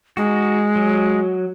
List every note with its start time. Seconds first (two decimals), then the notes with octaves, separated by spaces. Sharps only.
0.17 G#3 D#4 F#4
0.76 F#3